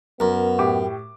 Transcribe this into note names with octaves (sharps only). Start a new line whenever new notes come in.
F#2 B3 A#4
A2 G4 D6